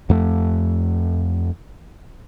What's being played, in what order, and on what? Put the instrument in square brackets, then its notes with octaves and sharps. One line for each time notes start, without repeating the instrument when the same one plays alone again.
[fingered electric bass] F2 A3